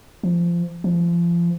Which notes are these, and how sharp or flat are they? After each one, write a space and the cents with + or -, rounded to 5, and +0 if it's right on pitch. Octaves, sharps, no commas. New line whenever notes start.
F3 -20
F3 -30